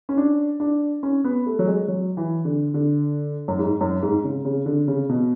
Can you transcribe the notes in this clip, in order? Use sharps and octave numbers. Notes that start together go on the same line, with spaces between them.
C#4
D4
D4
C#4
B3
A3
F#3
G#3
F#3
E3
D3
D3
F#2
G#2
F#2
G#2
C#3
C#3
D3
C#3
B2